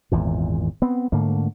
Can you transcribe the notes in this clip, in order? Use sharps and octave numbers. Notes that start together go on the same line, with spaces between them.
G#1 E2 A#2
B3 C4
G#2 D3 A3 A#3